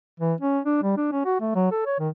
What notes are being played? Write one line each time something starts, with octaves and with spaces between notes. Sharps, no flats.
E3
C#4
D4
G3
D4
C#4
F#4
A3
F#3
A4
C#5
D#3